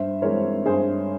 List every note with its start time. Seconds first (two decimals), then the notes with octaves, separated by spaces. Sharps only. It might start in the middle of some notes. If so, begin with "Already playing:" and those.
Already playing: G2 C5 E5
0.22 E3 G#3 C4 A#4 C#5
0.65 G2 G#4 C5